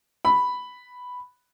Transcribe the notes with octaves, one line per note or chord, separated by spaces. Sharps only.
B5